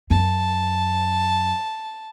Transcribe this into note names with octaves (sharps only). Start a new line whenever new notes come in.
F#2 A5